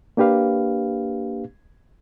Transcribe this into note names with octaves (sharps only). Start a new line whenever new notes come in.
A#3 D4 G4 B4 F5